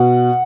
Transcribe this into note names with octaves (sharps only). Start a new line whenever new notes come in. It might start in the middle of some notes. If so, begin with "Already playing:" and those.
Already playing: B2 F#5